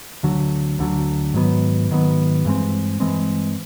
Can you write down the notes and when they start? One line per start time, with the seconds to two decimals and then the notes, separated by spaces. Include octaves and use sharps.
0.23 D2 D3 F#3
0.79 D2 D3 F#3
1.34 G#2 D#3 F#3 B3
1.90 G#2 D#3 F#3 B3
2.45 G2 E3 G#3 C4
3.00 G2 E3 G#3 C4